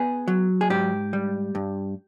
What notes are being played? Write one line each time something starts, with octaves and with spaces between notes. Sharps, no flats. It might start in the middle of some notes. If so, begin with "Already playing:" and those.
Already playing: B3 G#4
F#3
G#4
G#2 G4
G3
G2